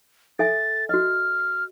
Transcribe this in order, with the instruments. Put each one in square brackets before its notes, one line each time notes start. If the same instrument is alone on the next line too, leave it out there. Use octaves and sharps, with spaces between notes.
[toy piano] A4 E5 G#5 [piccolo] A6
[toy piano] F#4 D#5 [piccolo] F6